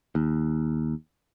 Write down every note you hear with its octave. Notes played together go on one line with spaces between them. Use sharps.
D#2